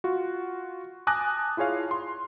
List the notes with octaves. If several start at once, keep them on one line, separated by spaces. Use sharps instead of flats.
F4 F#4
G#5 A5 D6 D#6 F#6 A#6
E4 F4 G#4 C#5 F5
C6